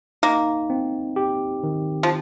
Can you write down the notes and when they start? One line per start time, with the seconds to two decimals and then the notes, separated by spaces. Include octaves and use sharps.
0.23 A#3 D#4
0.70 C4
1.16 G4
1.63 D#3
2.03 F3